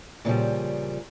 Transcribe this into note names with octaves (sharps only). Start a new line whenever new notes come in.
A#2 C#3 F3 G3